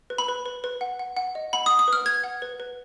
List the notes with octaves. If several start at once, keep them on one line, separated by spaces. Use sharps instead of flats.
B4
B5
B4
B4
B4
F#5
F#5
F#5
D#5
F#5 B5
D#6
F#5
D#6
B4 F6
B4 G#6
F#5
B4
B4